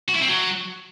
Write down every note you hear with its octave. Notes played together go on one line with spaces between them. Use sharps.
F#4
E4
C4
F#3